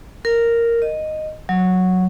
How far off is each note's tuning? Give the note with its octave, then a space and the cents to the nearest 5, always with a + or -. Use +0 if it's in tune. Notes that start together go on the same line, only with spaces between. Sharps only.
A#4 -5
D#5 -5
F#3 -5